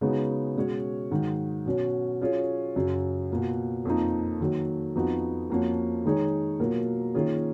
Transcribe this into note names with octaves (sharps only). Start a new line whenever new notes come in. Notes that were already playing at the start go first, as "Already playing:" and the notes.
C#3 G#3 B3 D#4 F#4
B2 G#3 C#4 F#4 C#5
G#2 D#3 F#3
B2 F#3 C#4 F#4
F#3 C#4 F4 G#4 C#5
F#2 C#3 F#3
B2 A#3 F4
F2 F3 A#3 D#4
D#3 F#3 A#3
F2 F3 B3 D#4 F#4
F2 F3 A#3 C#4 F#4
D#3 G#3 D#4 G#4 C#5
B2 F#3 A#3 F4 A#4
D#3 A#3 C#4 F4 G#4